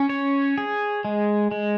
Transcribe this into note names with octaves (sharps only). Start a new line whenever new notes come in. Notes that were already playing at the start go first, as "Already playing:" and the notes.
Already playing: C#4
C#5
G#4
G#3
G#3